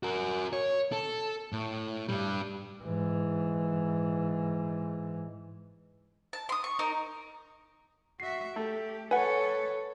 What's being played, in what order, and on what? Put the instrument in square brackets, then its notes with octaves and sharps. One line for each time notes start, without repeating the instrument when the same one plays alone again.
[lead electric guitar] F#4 A#4
C#5
A4
A2
G2 G3
[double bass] G#2 E3
[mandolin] A5
C6 D#6
C#6
D#4 A#4 A#5
[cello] F#4 E5 [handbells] C7
[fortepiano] A3 [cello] G4
[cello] A4 C#5 [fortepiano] B4 [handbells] F#5 G#5